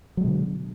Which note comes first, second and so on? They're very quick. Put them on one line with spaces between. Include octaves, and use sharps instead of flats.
F#3 G#3 B2 D3